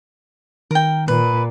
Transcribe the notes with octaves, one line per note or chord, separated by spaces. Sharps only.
D#3 A#4 G5
A#2 B4